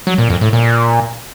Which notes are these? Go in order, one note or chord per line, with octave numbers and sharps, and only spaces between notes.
F#3
A#2
F2
A2
A#2